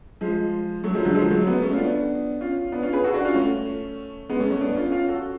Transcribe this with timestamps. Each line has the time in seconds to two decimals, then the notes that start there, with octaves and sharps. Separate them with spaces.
0.21 F3 G#3
0.84 F#3 A3
0.94 F3 G#3
1.05 D3 F#3
1.15 F3 G#3
1.31 F#3 A3
1.47 G#3 B3
1.62 A3 C#4
1.74 F4
1.78 B3 D4
2.41 C#4 F4
2.72 B3 D4
2.83 C#4 F4
2.93 G#4 B4
3.03 F#4 A4
3.14 D4 F#4
3.25 C#4 F4
3.35 A3 C#4
4.30 G#3 B3
4.40 A3 C#4
4.50 A3 C#4
4.61 B3 D4
4.76 C#4 F4
4.92 C#4 F4
5.08 F#4 A4